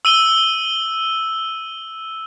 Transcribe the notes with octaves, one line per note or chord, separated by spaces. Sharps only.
E6 D#7 G7